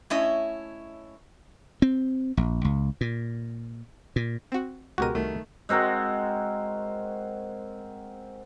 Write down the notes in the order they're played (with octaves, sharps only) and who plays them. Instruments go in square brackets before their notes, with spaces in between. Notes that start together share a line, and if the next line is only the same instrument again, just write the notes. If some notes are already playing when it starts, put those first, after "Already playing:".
[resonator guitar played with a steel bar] A3 C#4 E4 C#5 D#5
[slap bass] C4
A#1
C#2
A#2
A#2
[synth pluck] C4 F#4
[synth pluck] C#2 B2 D#7 [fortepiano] G#3 [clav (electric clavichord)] F#4 G4 A#4
[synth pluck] C2 [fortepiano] D#3 A3
[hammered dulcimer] G#3 C4 F#4 A#4